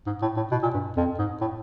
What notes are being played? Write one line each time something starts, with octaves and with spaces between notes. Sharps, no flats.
G#2
A2
A2
B2
A#2
G2
F2
G#2
A2